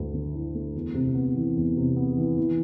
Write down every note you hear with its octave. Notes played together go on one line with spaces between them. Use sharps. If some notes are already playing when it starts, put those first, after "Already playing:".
Already playing: D2 D3 A3
D3
E4
A3
E2
C3
B3
E3
E2
C3
B3
E3
E3